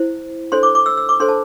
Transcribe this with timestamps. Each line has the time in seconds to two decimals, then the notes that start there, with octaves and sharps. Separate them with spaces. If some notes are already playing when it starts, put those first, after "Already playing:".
Already playing: E4 C5
0.52 D4 A4 C5 C6
0.63 D6
0.75 D6
0.86 E6
0.97 E6
1.09 D6
1.20 D4 A4 C5 C6
1.28 A5